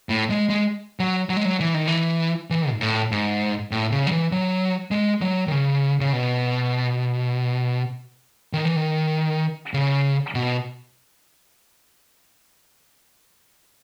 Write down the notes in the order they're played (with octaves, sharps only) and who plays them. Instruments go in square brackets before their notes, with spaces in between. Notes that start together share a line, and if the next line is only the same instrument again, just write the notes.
[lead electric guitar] A2
G#3
G#3
F#3
F#3
G#3
F#3
E3
D#3
E3
E3
G#2
A2
G#2
A2
C#3
F#3
E3
F#3
G#3
F#3
D#3
C#3
C#3
B2
D#3
E3
D#3
C#3
B2